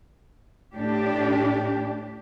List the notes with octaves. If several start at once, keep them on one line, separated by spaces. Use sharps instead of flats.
A2 D4 G4